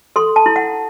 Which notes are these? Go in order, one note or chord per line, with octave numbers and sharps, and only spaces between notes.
A4 C6
A5
E4
F#5